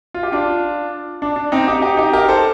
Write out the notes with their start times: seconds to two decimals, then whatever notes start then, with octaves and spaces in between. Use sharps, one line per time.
0.14 F4
0.23 G4
0.32 D4 F4
1.22 D4
1.36 D4
1.52 C4 D#4
1.67 D#4 G4
1.82 D#4 G4
1.97 D#4 G4
2.13 G4 A#4
2.28 A4 C5